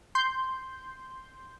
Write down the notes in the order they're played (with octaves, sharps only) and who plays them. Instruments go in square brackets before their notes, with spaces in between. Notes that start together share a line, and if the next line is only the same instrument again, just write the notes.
[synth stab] C6 G6